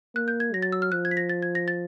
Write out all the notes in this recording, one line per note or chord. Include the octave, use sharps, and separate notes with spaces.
A#3 F#6
G6
G#6
F#3 A#6
A6
E6
F6
F3 F#6
G#6
B6
A#6
A6
G#6
A#6
A6